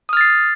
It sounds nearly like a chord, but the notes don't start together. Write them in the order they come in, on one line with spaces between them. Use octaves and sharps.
D#6 F6 A6 C7